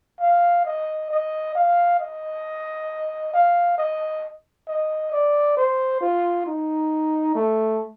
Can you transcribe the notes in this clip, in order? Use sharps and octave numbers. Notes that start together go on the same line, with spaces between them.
F5
D#5
D#5
F5
D#5
F5
D#5
D#5
D5
C5
F4
D#4
A3